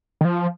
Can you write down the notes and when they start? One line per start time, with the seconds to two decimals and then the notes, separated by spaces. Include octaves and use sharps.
0.21 D#3
0.25 F3